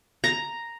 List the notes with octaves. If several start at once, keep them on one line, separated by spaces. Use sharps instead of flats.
A#5